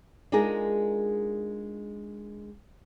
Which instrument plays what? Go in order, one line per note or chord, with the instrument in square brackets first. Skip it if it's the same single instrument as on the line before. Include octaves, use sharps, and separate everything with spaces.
[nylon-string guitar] G#3 D4 D#4 F4 G#4 A#4